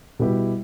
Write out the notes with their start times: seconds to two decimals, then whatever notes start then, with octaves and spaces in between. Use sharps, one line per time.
0.19 B2 G3 B3 E4 G4